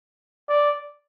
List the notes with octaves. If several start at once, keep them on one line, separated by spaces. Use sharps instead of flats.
D5